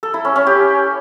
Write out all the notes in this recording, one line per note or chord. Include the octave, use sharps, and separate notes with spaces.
A4
E4
C#4
C#4
G4